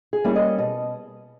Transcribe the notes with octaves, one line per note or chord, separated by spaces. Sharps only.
G#4
G3 A#3 C#4 E4
D#5
B2 D#5